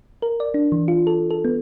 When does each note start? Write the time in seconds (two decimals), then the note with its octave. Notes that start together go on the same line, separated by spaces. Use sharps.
0.22 A#4
0.40 D5
0.54 D4
0.72 E3
0.88 F4
1.07 A4
1.31 A4
1.45 B3